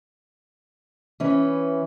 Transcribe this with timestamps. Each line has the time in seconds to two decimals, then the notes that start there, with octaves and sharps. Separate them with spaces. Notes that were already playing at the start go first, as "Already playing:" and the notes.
1.20 E3 C#4 B4